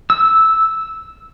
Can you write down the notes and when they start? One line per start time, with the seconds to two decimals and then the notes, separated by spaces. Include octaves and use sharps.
0.10 E6